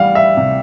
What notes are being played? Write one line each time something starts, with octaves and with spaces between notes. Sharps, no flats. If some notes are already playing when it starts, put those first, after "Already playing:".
Already playing: E3 G3 F5 F#5
E5
C3